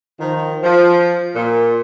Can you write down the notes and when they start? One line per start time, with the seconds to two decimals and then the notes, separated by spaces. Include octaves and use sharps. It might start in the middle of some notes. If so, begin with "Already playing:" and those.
0.20 D#3 F3
0.63 F3
1.36 A#2